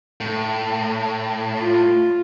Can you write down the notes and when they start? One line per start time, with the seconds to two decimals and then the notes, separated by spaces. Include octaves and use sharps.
0.20 A2
1.57 F4